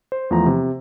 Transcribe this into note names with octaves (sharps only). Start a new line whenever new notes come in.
C5
E2 F3 A3 A#5
C3